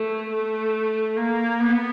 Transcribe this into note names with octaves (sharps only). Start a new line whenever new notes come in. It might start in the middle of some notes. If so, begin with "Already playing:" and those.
Already playing: A3
A3
A#3
B3